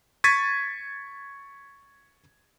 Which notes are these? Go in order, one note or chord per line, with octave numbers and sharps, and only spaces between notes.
C#6 G#6 A6 B6 D#7